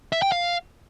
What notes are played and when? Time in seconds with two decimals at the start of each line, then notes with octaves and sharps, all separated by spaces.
0.13 E5
0.22 G5
0.32 F5